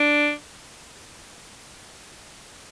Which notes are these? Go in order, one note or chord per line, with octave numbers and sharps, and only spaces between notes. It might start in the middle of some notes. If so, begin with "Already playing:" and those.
Already playing: D4